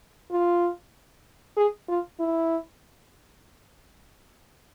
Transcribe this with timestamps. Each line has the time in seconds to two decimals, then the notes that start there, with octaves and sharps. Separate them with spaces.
0.31 F4
1.57 G#4
1.88 F4
2.20 E4